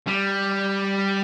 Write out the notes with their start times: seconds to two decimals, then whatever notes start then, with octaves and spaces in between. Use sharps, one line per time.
0.07 G3